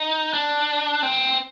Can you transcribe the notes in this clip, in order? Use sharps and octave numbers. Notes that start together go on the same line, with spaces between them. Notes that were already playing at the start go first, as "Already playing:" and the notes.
Already playing: D#4
D4
C4